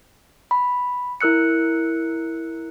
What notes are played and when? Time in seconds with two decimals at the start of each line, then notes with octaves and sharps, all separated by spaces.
0.51 B5
1.21 E4 A#4 E6 F#6 C#7